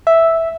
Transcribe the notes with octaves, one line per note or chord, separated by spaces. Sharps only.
E5